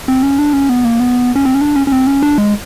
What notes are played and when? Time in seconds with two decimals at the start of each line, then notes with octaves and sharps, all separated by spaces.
0.08 C4
0.23 C#4
0.39 D4
0.53 C#4
0.69 B3
0.85 A#3
1.00 B3
1.35 C#4
1.45 C4
1.54 C#4
1.61 D4
1.76 C#4
1.87 C#4
1.92 C4
2.07 C#4
2.23 D4
2.38 G#3